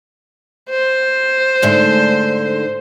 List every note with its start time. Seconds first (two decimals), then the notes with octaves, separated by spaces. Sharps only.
0.70 C5
1.62 G#2 D3 A3